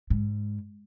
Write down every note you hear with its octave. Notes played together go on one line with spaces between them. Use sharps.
G#2